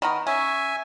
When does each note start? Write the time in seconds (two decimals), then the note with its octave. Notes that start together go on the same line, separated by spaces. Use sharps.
0.02 D#3 B3 A#4
0.27 C#4 E5 G#5